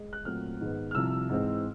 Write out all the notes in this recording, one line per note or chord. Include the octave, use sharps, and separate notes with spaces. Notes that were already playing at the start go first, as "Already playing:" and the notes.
Already playing: G#3
F#6
A#2 F#3 A3 C4 F6
G#2 D#3 G#3 B3
F6
C2 C3 F3 E6
G#2 E3 G#3 C4